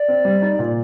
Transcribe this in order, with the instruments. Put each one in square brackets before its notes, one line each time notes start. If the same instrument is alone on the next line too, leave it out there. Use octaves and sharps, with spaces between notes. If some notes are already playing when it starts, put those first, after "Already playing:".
Already playing: [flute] D5
[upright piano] C4
G3
D#4
A#2